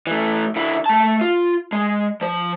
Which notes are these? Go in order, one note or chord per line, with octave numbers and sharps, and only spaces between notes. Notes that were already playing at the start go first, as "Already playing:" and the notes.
E3 A3
D3 E4
A3 A5
F4
G#3
F3 C5